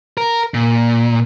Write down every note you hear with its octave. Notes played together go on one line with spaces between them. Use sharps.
A#4
A#2